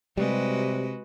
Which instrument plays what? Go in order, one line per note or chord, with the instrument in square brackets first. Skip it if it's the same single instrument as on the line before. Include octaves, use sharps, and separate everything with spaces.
[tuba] C3 [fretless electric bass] G3 [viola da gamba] G#3 F#4 B4